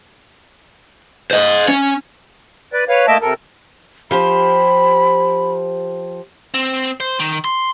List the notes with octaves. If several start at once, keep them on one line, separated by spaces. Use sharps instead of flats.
C5 D#5
C#4
B4 D5
B4 C#5 F5
A3 A#3 D#5 E5 A5 D6
C3 A4 A#4
F3 G4 C5 B5
C4
C5
D#3
C6